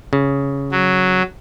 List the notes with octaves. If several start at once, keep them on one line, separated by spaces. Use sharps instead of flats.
C#3
F#3